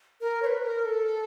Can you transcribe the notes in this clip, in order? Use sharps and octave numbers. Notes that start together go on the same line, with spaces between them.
A#4
C#5
B4
A#4
A4